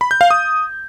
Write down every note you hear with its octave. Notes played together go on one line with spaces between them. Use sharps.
B5
G6
F5
D#6